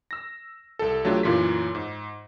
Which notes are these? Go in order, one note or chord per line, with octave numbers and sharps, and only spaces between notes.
E6 A#6
C2 A4
F#3 A3 D4 F4 G4
F#2 A#2 E3 F4 B6
G#2